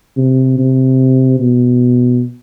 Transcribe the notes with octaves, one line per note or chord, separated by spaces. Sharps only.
C3
C3
B2